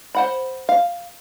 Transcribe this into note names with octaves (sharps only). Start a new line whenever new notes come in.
C5 F#5 B5
F5